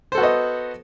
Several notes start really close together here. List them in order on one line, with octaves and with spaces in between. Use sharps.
C5 A4 F#4 B3 D#5